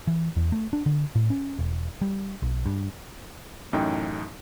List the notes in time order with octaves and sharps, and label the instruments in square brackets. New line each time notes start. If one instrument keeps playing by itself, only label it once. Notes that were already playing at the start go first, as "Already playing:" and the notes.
[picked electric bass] E3
E2
A3
D4
D3
A2
C#4
E1
G3
B1
G2
[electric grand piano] A1 F#2 A2 D#4 G5